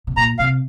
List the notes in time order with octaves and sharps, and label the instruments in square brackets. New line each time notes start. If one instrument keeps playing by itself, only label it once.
[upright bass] C3
[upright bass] A#2 [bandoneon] A#5
[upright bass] C3 [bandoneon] F5